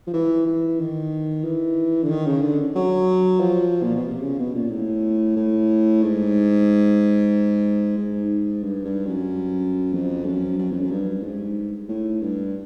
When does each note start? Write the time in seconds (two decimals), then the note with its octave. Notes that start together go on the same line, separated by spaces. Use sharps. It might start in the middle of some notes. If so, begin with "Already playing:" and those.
0.07 F3
0.14 E3
0.47 E3
0.80 D#3
1.44 E3
2.03 D3
2.10 D#3
2.26 C#3
2.42 D3
2.75 F#3
3.41 F3
3.83 A#2
3.96 B2
4.08 C3
4.22 C#3
4.39 B2
4.54 A#2
4.71 A2
5.36 A2
6.02 G#2
7.98 G#2
8.63 G2
8.85 G2
9.06 F#2
9.94 F2
10.25 F#2
10.58 F#2
10.71 F2
10.80 F#2
10.91 G2
11.23 G#2
11.89 A2
12.21 G2